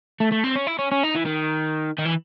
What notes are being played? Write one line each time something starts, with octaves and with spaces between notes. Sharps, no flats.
A3
A3
C4
C#4
E4
C#4
C#4
D#4
E3
D#3
D#3
E3